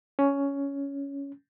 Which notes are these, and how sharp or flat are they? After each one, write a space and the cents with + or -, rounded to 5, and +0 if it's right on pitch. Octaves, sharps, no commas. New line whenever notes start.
C#4 +10